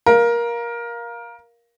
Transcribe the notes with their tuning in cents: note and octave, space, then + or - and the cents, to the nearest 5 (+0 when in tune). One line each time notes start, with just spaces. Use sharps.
A#4 +15 F5 +0